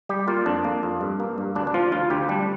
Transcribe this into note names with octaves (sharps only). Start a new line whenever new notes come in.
G3 G4
A#3 F4
F2 D4
A#3
F2
G2
A#3
G2
D2 D4
D4
F3 F4
D2 F4
D2 G4
G3 D4